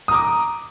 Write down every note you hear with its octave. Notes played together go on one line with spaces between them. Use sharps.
A#5 D6 D#6